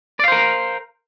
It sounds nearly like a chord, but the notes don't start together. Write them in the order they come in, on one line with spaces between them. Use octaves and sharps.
D5 F5 C5 A#4